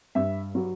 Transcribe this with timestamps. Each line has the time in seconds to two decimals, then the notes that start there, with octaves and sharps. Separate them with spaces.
0.15 G2 E5
0.55 F#3